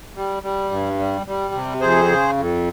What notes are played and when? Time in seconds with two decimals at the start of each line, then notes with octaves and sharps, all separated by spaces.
0.16 G3
0.43 G3
0.71 G2
0.99 G3
1.27 G3
1.54 C3
1.81 F2 G#4 C5
2.09 C#3
2.37 F2